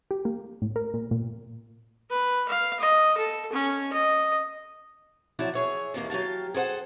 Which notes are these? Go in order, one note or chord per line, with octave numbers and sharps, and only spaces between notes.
G4
A#3
A2
A#4
A#2
A#2
B4
F5
D#5
A4
C#4
D#5
F3 F#3 E4 D5 A5
G#4 C#5 E5
D#2 D#3 E3 A#3
F#3 G4 F5 A5
G#4 A4 C5 F#5